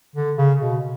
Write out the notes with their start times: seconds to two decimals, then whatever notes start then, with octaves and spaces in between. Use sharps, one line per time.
0.16 D3
0.38 C#3
0.61 B2